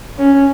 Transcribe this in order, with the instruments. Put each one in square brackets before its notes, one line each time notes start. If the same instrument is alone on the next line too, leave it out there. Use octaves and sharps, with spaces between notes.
[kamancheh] C#4